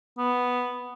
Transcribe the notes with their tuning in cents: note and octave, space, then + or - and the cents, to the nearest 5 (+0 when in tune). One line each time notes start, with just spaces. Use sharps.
B3 +0